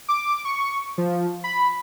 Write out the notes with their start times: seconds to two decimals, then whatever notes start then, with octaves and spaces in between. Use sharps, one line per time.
0.08 D6
0.45 C#6
0.98 F3
1.44 B5